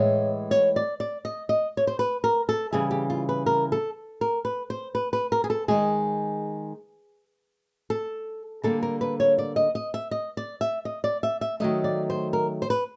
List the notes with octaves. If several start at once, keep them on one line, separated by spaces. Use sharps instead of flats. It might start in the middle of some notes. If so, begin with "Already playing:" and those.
Already playing: A2 E3 G#3 C#5
C#5
D5
D5
D#5
D#5
C#5
C5
B4
A#4
A4
C#3 E3 G3 G#4
G4
F4
B4
A#4
A4
A#4
B4
C5
B4
B4
A#4
G#4
A4
D#3 G#3 G#4
A4
D3 G3 A#3 A4
A#4
B4
C#5
D5
D#5
D#5
E5
D#5
D5
E5
D#5
D5
E5
E5
D#3 F#3 A3 D#5
D5
C5
A#4
C5
B4